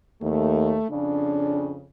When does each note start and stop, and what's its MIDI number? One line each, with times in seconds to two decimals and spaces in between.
0.22 0.77 39
0.22 0.87 57
0.90 1.86 41
0.90 1.86 49
0.90 1.76 62